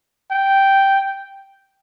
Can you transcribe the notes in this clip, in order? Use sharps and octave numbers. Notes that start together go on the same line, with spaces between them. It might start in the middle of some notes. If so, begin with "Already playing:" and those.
G5